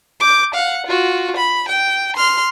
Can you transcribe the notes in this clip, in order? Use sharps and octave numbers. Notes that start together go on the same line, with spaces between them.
D6 G6
F5 F#5
F4 F#4
B5
G5
C6 F6